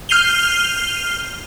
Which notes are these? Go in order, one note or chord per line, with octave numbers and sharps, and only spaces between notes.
F6 G6 C7 D#7 F7 G7